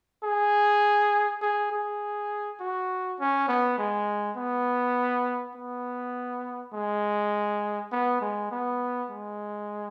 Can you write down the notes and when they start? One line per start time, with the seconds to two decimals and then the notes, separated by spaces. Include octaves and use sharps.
0.24 G#4
1.42 G#4
1.72 G#4
2.60 F#4
3.20 C#4
3.49 B3
3.78 G#3
4.37 B3
5.55 B3
6.74 G#3
7.92 B3
8.21 G#3
8.52 B3
9.10 G#3